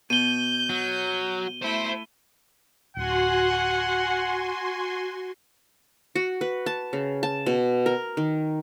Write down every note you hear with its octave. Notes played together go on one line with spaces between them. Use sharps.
B2 G6 D#7 G7
F#3
A3 E4 C5
D1 F#4 F#5 G#5 C6
F#4
B4
A5
C#3
A5
B2
A#4
D#3